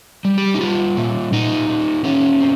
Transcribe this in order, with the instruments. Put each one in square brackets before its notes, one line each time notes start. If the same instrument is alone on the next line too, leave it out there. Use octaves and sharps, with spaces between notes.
[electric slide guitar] G3
G4
D#4
G3 F4
A#2
A#2 D#4
A#2
A#2 C#4
C4